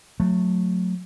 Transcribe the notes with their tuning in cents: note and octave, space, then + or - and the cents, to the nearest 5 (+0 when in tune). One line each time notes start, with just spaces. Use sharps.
F#3 -25 A3 +0